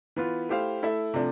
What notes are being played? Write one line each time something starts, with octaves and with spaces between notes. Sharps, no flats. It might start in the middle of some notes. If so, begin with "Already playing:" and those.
E3 B3 F4
A3 E4 G4 C5 F5
A3 E4 A4 E5
C3 F3 A3 D4